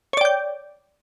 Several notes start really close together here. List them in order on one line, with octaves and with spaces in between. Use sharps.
C#5 D5 G5 G6